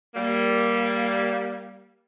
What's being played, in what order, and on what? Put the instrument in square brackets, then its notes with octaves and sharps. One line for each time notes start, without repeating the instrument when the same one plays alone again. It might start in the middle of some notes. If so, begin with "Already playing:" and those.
[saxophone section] G3 A#3